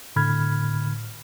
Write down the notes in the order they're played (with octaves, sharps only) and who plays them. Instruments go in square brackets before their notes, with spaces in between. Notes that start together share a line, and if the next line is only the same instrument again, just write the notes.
[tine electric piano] A2 D3 B5 F6 G#6